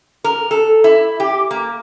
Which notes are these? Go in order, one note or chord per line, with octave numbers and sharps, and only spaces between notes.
A#4
A4
E4
G4
A#3